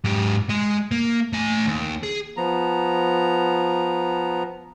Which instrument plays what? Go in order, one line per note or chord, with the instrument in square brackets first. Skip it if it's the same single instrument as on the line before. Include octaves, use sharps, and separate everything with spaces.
[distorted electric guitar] G#2 G4
G#3 D#5
A#3
A3 G#5
D#2
G#4
[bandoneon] F3 B3 A#5